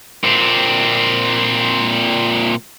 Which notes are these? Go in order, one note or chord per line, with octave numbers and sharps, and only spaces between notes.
A#2 C4